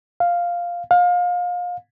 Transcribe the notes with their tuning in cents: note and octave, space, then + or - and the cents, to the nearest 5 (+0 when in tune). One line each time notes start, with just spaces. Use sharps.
F5 +0
F5 +30